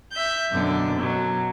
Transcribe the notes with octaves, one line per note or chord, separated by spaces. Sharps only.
E5 G6
F#2 B2 D3
B2 F#3